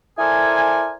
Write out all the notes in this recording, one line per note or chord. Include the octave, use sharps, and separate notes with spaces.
E4 A4 A#4 C5 D5 G#5